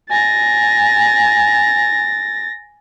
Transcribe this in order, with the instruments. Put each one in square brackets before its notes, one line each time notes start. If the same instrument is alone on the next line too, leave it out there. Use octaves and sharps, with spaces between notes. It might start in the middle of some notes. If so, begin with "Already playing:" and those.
[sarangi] G#5 [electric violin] A6 A#6